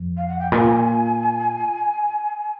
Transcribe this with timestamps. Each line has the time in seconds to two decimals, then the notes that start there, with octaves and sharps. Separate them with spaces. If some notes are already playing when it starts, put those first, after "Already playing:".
Already playing: F2
0.17 F5
0.28 F#5
0.39 G5
0.51 A#2 G#5